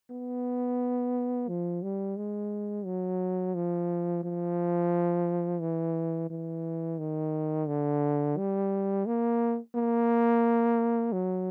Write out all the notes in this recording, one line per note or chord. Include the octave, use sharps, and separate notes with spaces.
B3
F3
G3
G#3
F#3
F3
F3
E3
E3
D#3
D3
G3
A#3
A#3
F#3